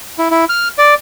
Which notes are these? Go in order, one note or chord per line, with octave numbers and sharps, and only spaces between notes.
E4
E4
F6
D5